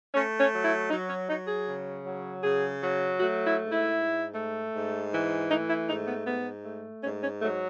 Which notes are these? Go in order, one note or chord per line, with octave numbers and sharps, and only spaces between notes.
A3 C#4
C#4
F#3
E4
F#3 D#4
C#4
F#3 D#4
G#4
C#3
F#3
C#3 G#4
F#3
A3 F#4
E4
G#2
E4
G#2
A3
G#2
E3
A3 D#4
E4
G#2 D#4
B3
G#2 B3
A3
G#2 C#4
C#4
F#3 A3